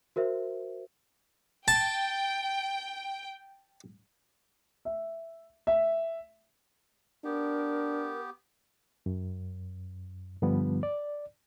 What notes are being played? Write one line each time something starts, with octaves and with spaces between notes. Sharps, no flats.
F#4 A#4 C5 E5
G5 A5
E5
E5
B3 D4 G4 A#4
F#2
G2 D3 F3 G3 B3
D5